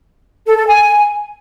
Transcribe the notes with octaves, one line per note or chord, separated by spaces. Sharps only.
A4
A4
G#5